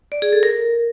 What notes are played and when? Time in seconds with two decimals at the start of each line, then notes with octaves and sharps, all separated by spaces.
0.12 D5
0.22 G#4
0.33 A4
0.43 A#4